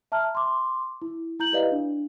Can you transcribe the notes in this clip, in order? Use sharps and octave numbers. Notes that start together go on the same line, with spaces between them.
E5 A5 A#5 F6
C6 D6
E4
E4 A#5 G6 F#7
E4 G4 B4 D5 D#5 F5
D4